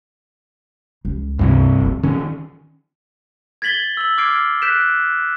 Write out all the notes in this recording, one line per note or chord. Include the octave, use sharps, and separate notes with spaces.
C#2
G2 C3 E3
F3 C4
D#3 C#4
G#6 A6 B6 F#7 G7
E6 F#7
D6 F6 G#6 C7 D7
F#6 G6 B6 D7 E7